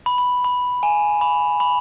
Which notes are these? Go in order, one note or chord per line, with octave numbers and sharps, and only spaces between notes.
B5
B5
B5
G#5
B5
B5